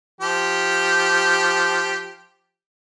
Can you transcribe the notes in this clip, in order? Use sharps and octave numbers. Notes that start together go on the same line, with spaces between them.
F3 G4